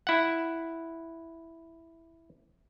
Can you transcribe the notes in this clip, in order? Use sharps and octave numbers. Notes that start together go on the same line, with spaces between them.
E4 F#5